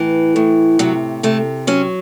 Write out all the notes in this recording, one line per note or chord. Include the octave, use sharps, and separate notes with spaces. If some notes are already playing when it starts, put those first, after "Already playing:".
Already playing: A2 E3
A2
C3 F#3
C3 A3
F#3 C#4